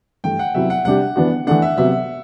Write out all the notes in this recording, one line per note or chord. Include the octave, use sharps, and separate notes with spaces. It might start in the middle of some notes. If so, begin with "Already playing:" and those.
G2 E3 A3 G5
F#5
C3 F#3 B3 E4 E5
F#5
C3 G3 D4 G4 F#5
E3 B3 D4 F#4
E3 A3 D4 F#5
E5
C3 F#3 B3 F#4 E5